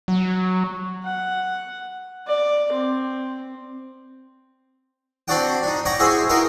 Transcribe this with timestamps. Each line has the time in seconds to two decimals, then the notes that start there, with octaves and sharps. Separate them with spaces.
0.08 F#3
1.04 F#5
2.27 D5
2.73 C4
5.28 C4 D4 F#4 D5 F#5 G5
5.63 D4 D#4
5.85 C#5 F#5 G5 A#5 D6
5.99 E4 F#4 G#4 C5 E5 C6
6.29 B3 D#4 E4 F#4 A#4 G5